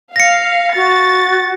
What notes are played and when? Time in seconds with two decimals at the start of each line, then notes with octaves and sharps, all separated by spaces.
0.16 F5 A#6 C#7
0.75 F#4 A6